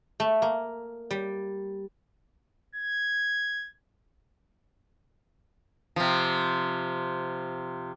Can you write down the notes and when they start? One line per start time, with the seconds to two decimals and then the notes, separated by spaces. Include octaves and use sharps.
0.20 A3
0.42 A#3
1.11 G3
2.75 G#6
5.96 C3 F3